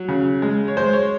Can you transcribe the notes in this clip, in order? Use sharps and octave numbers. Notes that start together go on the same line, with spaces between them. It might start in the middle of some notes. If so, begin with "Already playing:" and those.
Already playing: F#3
C#3
G#3
C#5
G#3 C5
C#5